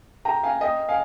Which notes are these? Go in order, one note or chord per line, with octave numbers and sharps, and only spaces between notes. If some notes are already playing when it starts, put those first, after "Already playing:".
G5 A#5
F5 G#5
D#5 G5
F5 G#5